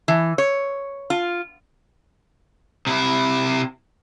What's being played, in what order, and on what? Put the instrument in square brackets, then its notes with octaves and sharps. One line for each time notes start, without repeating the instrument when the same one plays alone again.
[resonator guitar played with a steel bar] E3
C#5
F4
[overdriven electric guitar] C3 E4